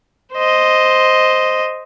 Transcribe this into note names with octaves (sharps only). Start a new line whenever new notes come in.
C5 D#5